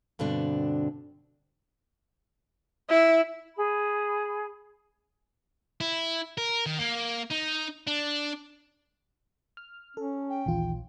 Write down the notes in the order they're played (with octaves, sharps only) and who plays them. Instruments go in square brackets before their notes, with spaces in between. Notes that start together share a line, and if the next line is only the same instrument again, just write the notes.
[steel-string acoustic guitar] G2 B2 D3 C4 D4
[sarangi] E4
[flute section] G#4 B5
[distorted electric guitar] E4
A#4
D#3
A#3
D#4
D4
[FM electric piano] F6
[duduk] C#4 [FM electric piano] A4
[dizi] G5
[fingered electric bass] D#1 D#2 E3 [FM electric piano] A#1 F4